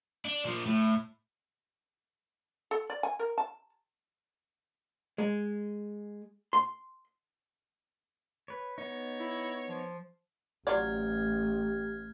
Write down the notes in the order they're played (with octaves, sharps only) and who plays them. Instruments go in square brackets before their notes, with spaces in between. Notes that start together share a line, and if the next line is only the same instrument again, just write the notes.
[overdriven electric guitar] D4
A#2 F3
A2
[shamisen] A4
D5
G#5
A#4
A5
[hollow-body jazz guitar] G#3
C6
[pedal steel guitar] B4 C#5
[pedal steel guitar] B3 D#4 [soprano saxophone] C#5
[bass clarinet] E4
F3
[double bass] A1 [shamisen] F#3 F4 D5 [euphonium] G4 [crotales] F6 G#6